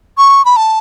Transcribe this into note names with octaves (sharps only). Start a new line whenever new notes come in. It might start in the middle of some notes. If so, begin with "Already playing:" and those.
C#6
B5
A5